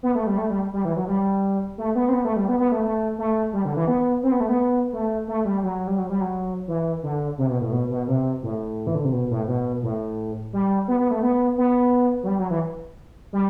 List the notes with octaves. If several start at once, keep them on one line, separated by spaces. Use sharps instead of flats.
B3
A3
G3
A3
G3
G3
E3
F#3
G3
A3
B3
C4
B3
A3
G3
B3
B3
A3
A3
A3
G3
D3
E3
B3
C4
B3
A3
B3
A3
A3
G3
F#3
G3
F#3
G3
F#3
E3
D3
C3
B2
A2
B2
B2
C3
A2
E3
D3
C3
B2
A2
B2
A2
G3
B3
B3
A3
B3
B3
F#3
G3
F#3
E3
G3